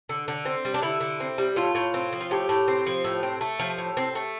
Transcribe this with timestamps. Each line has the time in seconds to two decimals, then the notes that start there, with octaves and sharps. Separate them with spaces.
0.09 D3
0.28 D3
0.45 C4
0.65 G3
0.74 D4
0.82 D3 E4
1.01 D3
1.20 C4
1.38 G3
1.56 A2 F4
1.75 A2
1.94 C4
2.13 F3
2.21 F4
2.31 A2 G4
2.49 A2
2.68 C4
2.87 F3
3.04 A2
3.23 C4
3.41 A3
3.59 F3
3.78 A2
3.97 C4
4.15 A3